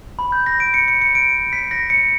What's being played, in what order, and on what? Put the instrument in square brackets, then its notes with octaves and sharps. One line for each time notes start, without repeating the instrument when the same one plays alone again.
[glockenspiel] B5
G6
A#6
D7
C#7
C#7
C#7
D7
B6
A#6
C#7